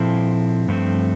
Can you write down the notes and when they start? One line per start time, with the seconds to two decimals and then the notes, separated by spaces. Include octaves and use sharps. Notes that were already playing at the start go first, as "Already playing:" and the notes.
Already playing: A#2 F3 C4 E4 A4
0.68 G2 F3 A3 C4